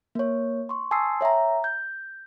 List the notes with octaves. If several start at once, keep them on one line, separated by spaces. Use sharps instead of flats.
A#3 C#5
C6 C#6
G#5 A5 C6 D#6 E6 C7
C#5 E5 G5 A#5
G6